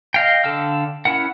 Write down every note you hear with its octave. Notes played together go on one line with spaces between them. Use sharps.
D#5 F5 G5
D3 A4 F5 G5 F6
C#4 E4 A#4 F#5